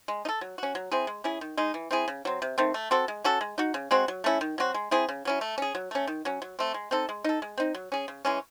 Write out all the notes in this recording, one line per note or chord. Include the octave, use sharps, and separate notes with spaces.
G#3
D#4
A4
F#3
C#4 F#4
F#3
C4 E4 G#4
G#3
C#4 E4 G#4
D#3
G#3 D#4
E3
C4 E4 G#4
C#3
F#3 C4
C3
D#3 A3 C4
A3
C4 F#4 A4
G#3
C#4 F#4 A4
G#3
D#4 F#4
C#3
G#3 C4 F#4
F#3
A3 C#4 E4
D#3
F#3 C4 F#4
G#3
C4 E4 G#4
C#3
F#3 C#4 E4
A3
C#4 G#4
F#3
A3 C#4
D#3
F#3 C#4
F#3
A3 C4
G#3
C4 D#4 A4
G#3
D#4 A4
G#3
C4 D#4
F#3
C#4 G#4
C#3
E3 G#3 C#4